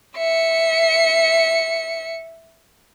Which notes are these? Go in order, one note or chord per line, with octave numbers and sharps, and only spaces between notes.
E5 C#7